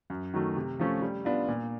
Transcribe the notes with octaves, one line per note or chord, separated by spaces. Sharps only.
F#2
D#3 F#3 A3
C3
F3 A3 C#4
G3
B3 D4 F4
A#2